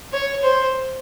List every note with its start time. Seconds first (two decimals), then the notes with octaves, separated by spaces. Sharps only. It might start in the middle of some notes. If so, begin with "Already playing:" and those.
0.13 C#5
0.43 C5